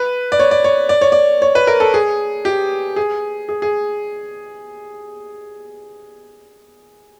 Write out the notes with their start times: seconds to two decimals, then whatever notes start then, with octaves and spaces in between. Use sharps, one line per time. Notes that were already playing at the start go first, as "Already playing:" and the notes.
Already playing: B4
0.32 D5
0.39 C#5
0.51 D5
0.64 C#5
0.89 D5
1.01 C#5
1.12 D5
1.42 C#5
1.55 B4
1.67 A#4
1.80 A4
1.94 G#4
2.45 G4
2.96 G#4
3.49 G#4
3.62 G#4